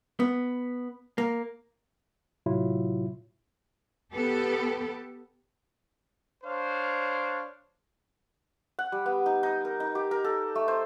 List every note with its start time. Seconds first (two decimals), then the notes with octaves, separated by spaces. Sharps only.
0.20 B3
1.18 A#3
2.46 A2 C3 F#3 E4 F4
4.13 B3 G4 A4
6.44 D4 C5 C#5 F5
8.79 F#5
8.92 G3
9.06 B3
9.26 D#4
9.43 D#4
9.65 A#4
9.80 D#4
9.95 G4
10.11 A#4
10.24 A4
10.55 A3
10.68 C5